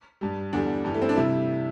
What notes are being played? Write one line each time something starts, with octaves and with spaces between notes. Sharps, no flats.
G2 G3
E2 D3 G3 D4
G2 E3 G3
A3
C4
D4
C3 G3 E4